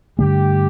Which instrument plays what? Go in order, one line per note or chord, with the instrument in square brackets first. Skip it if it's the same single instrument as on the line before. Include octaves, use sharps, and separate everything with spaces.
[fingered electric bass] G2 D3 A3 [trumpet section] G4